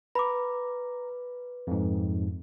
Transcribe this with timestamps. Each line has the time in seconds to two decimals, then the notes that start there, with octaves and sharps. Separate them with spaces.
0.15 B4 A#5 B5 D6
1.67 F2 G#2